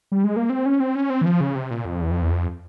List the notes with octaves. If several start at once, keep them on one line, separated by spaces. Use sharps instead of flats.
G3
G#3
A#3
C4
C#4
C4
C#4
C4
E3
F3
C#3
C3
A#2
F2
E2
F2
E2
F2